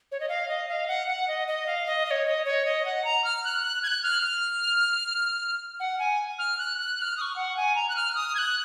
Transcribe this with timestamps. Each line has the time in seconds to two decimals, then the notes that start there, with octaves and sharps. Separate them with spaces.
0.12 C#5
0.20 D#5
0.29 F5
0.49 D#5
0.69 F5
0.88 F#5
1.08 F#5
1.28 D#5
1.48 D#5
1.67 F5
1.86 D#5
2.06 D#5
2.11 C#5
2.26 D#5
2.45 C#5
2.66 D#5
2.85 F#5
3.04 A#5
3.24 F6
3.44 F#6
3.63 F#6
3.83 G#6
3.88 F#6
4.03 F6
4.22 F6
5.80 F#5
5.99 G#5
6.39 F6
6.58 F#6
6.78 F#6
6.97 F#6
7.02 F6
7.17 D#6
7.22 C#6
7.36 F#5
7.57 G#5
7.76 A#5
7.89 F#6
7.96 F6
8.15 D#6
8.35 G#6
8.38 F#6